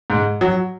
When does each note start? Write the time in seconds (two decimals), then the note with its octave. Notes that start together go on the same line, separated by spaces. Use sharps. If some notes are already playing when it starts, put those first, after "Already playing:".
0.10 G#2
0.41 F#3